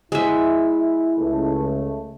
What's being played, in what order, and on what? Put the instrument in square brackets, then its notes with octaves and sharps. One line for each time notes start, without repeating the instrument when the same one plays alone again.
[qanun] G#3 E5 [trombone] E4
[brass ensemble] C#2 A3